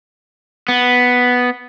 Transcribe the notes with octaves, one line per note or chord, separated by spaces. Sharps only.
B3